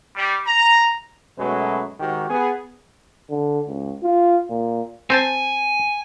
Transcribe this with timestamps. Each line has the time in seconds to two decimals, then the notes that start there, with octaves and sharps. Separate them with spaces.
0.16 G3
0.46 A#5
1.38 F#2 B2 F#3 G#3 A3 B4
2.00 G#2 D#3 F#4 G4
2.30 B3 G#4
3.30 D3
3.68 C#2
4.03 F4
4.50 A#2
5.10 C4 C5 G#5 A5